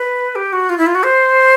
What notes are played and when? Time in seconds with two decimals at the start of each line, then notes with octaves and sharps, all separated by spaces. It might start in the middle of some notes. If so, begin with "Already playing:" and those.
Already playing: B4
0.35 G4
0.53 F#4
0.69 F4
0.78 E4
0.86 F4
0.95 F#4
1.03 C5